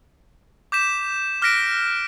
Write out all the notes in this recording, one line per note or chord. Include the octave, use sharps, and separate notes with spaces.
D6 G6 B6 E7
D6 F6 F#6 A#6 B6 D7